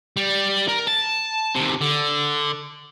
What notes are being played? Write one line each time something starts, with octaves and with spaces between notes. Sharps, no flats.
G3
A#4
A5
D#2 C3
D3